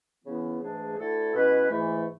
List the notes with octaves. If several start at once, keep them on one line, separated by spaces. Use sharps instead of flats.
C#3 E3 B3 E4
G#2 E3 A3 D4 G#4
D2 D3 A3 E4 A4
B2 G#3 C#4 E4 B4
G#2 E3 A3 E4